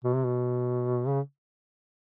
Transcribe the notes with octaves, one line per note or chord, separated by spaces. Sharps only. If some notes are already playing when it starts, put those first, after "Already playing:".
B2
C3
B2
C#3